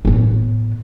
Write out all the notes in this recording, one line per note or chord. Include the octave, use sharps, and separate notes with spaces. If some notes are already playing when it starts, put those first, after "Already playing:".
A2 B3